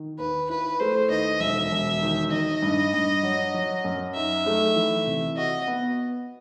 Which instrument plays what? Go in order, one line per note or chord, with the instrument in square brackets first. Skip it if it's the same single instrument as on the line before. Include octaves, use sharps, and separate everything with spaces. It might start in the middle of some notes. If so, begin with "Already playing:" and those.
Already playing: [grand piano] D#3
[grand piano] D#2 [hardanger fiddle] B4
[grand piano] E4 [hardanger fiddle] B4
[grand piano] A3 [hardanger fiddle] C5
[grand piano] D#2 [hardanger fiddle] D#5
[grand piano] E1 [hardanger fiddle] E5
[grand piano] E1
D#3
[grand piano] D#3 [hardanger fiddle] D#5
[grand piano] G2
G2
F#3
F#3
F#2
[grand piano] D#4 [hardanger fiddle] E5
[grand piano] A3
E3
C3
[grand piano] F#4 [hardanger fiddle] D#5
[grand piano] B3